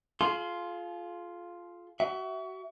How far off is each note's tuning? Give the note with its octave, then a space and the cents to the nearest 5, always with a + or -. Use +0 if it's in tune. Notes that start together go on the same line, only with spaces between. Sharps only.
F4 +0 G#4 +45 C6 +0
F#4 +30 E5 +0